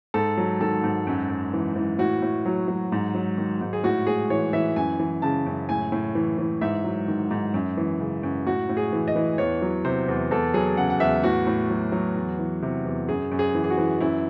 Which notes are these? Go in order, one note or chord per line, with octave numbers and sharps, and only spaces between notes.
G#2 A4
F#3
D#3 A4
G#2
F#2
F#2
E3
E3
A2 F#4
A2
F#3
F#3
G#2
F#3
D#3
G#2
G#4
A2 F#4
A2 G#4
E3 C#5
E3 E5
F#2 G#5
E3
C#3 A5
F#2
A2 G#5
A2
E3
E3
G#2 E5
F#3
D#3
G#2
F#2
E3
C#3
F#2
A2 F#4
A2
G#4
E3
D#5
E3
E2 C#5
F#3
C3 C5
E2
E2 A4
F#3 G#4
C#3 F#5
F#5
E2 E5
A2 F#4
A2
F#3
F#3
E2
E3
C3
E2
F#2 G#4
F#2
G#4
E3
G#4
F#4
E3
F#2 E4